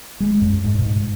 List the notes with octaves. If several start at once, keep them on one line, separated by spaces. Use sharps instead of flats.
G#3
F#2
G#2
B2
G#2